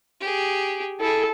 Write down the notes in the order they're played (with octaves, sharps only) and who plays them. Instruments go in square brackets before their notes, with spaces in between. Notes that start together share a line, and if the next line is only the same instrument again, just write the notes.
[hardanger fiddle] G4 G#4
[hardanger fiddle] E4 G#4 [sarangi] A4